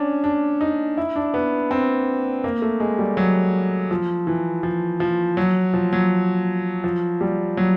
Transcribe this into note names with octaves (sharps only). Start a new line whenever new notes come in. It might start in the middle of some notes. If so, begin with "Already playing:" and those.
Already playing: C#4 D4
D4
D#4
E4
D4
B3
C4
A#3
A3
G#3
G3
F#3
F3
E3
F3
F3
F#3
F3
F#3
F3
G3
F#3